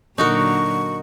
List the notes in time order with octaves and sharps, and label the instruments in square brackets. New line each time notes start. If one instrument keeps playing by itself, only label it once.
[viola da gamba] A#2 D3 F#3 [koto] D#4 F#4 A#4 [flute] C#6